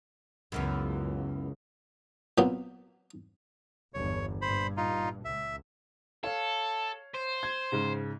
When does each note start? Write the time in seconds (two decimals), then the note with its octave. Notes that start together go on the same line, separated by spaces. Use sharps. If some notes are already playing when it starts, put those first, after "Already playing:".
0.52 C#2 F#2 E3 B3
2.38 A#2 F#3 B3 C4
3.94 G1 E2 C#5
4.42 G2 A#2 C5 B5
4.77 D#4 F4
5.25 C#2 E5
6.24 A4 C#5 F5
7.15 C5
7.43 G#6
7.72 G#2 C#3